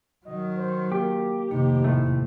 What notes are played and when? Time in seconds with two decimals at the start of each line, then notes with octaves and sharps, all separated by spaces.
0.25 D#3 F#3 D#5
0.57 C5
0.92 A#3 G4
1.51 F1 C3 D#3 A#3 D#4
1.84 E2 A2 A3